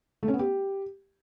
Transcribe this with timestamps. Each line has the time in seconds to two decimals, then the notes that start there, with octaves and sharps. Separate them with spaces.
0.23 A3
0.28 C#4
0.34 B3
0.39 G4